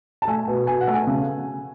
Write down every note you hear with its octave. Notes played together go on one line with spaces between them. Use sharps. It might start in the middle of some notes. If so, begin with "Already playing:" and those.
A5
A3 G#5
B2
B2 G#5
F#5
A3
G#5
C#3